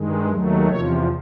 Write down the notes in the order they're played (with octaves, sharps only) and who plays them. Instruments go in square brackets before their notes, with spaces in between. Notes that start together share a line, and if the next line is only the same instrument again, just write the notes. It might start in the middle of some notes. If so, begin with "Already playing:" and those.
Already playing: [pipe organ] G2 D#3 G#3
D#2 D#3 F#3 A3
E2 C3 F3 C#5